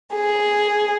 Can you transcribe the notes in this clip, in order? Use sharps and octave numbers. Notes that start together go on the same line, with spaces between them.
G#4